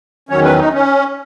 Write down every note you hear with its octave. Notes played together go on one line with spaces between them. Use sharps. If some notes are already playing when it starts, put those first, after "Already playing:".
E2 D#3 F#3 C#4 C#5
B4
D#4
C#4